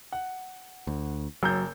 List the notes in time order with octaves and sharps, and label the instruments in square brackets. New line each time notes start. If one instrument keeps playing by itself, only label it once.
[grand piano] F#5
[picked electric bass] D2
[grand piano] F#1 A#5 G6 [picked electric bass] F#3